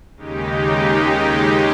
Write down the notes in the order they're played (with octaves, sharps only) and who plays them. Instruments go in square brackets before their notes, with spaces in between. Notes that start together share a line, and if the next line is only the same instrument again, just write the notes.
[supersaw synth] D#2 C#3 G#3 D#4 G4